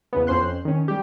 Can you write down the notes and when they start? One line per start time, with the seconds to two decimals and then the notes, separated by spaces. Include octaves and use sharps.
0.13 E2 C#3 B3
0.27 F2 C#4 C5 C6 F#6
0.65 D#3 C#4
0.88 G3 G4